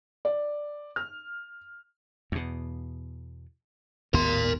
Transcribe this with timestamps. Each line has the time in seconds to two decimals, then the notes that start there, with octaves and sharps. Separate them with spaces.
0.25 D5
0.96 F6
2.32 E2 B2
4.14 G#1 D#2 B3 A#4 C6